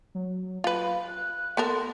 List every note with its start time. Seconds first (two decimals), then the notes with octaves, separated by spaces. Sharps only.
0.15 F#3
0.64 F4 B4 F5
1.08 F#6
1.57 B3 A4 A#4 C6